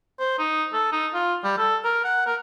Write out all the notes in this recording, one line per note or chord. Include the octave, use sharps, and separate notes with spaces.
C5
D#4
A4
D#4
F4
G3
A4
A#4
F#5
A#4